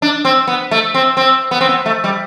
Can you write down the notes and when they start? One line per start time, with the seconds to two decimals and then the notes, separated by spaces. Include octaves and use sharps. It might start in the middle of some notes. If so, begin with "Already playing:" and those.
0.02 D4
0.25 C4
0.47 B3
0.71 A3
0.94 C4
1.17 C4
1.51 B3
1.61 C4
1.69 B3
1.86 A3
2.04 G3